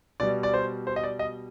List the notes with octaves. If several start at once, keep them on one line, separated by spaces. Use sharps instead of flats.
B2 G3 D5
D5
C5
C5
D#5
D5
D#5